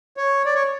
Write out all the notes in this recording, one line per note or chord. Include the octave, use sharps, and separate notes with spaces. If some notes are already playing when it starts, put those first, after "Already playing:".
C#5
D5
C#5